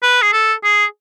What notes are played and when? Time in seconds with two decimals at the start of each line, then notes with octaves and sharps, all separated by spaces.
0.03 B4
0.22 G#4
0.33 A4
0.64 G#4